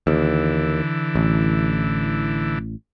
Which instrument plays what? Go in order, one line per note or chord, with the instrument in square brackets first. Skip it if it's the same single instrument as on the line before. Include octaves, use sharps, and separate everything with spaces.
[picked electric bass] D#2 [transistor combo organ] D3 E3
[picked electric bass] A1